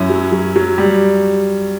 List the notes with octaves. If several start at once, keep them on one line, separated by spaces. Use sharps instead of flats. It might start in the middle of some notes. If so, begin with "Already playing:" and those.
Already playing: F#2 C#4 E4
F#3
F#3
F#3
G3